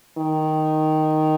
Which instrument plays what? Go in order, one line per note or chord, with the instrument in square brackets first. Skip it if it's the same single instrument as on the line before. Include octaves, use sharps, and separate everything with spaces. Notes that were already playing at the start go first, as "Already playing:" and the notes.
[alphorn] D#3